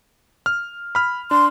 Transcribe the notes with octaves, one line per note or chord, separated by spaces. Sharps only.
F6
B5 F6
D4 C6